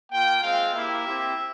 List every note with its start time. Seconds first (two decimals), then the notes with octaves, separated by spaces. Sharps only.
0.12 A#3 F4 G5
0.42 G#3 C4 F4 F5
0.73 A#3 E4 G4 E5
1.04 C4 E4 G4